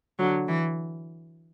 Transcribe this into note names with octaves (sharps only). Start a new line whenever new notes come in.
D3 F#3
E3